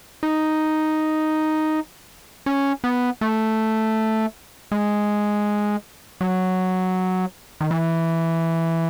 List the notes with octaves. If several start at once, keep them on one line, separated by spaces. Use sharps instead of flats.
D#4
C#4
B3
A3
G#3
F#3
D#3
E3